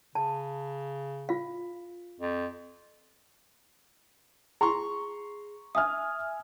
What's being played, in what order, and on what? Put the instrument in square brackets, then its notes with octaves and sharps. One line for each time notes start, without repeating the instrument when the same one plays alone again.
[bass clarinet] C#3 [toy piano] A5
[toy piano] F4 F5
[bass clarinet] F2
[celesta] G#4 [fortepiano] A#5 C6 C#6
[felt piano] E5 G#5 F6 [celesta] D#6